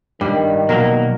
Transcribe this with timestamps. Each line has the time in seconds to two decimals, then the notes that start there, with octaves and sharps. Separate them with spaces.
0.21 G2 D#3 G3
0.69 B2 F#3 A#3 A#4